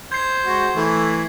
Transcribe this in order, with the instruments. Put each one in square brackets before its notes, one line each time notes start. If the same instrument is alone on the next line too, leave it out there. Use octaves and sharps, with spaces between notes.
[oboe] C5 [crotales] G#6 C7
[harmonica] G#3 F#4
E3 A3